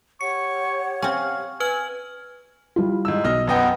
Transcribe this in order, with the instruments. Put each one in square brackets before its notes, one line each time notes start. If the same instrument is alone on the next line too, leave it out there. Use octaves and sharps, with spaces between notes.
[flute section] G4 C#5 F#5 [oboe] C#6 [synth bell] C#7
[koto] C4 C#4 [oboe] F5 [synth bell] C#6
[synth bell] B4 F6 F#7 [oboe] G#5
[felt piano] G3 E4 F4
[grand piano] G#2 E6
[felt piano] B1 [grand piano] D#5 F6
[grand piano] F#2 D#5 G5 [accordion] B3